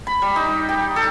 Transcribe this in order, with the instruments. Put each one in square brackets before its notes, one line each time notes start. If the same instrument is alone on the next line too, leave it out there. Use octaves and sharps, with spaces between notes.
[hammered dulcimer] B5
G3
D#4
G4
A4